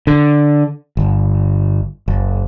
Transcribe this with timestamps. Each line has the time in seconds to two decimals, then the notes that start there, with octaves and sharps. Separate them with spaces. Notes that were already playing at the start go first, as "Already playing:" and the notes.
0.07 D3
0.97 G1
2.08 F#1